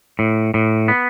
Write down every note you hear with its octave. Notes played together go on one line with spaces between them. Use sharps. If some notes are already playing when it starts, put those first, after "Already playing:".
A2
A2
B3